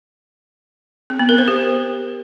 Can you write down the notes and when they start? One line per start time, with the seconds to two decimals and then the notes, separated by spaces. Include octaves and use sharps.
1.10 C4
1.19 B3
1.29 A#4
1.38 C5
1.48 G4